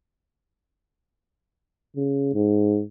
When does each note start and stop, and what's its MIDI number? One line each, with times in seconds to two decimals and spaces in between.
1.96 2.32 49
2.34 2.82 44